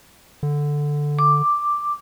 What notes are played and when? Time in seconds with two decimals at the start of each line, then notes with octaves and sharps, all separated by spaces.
0.43 D3
1.19 D6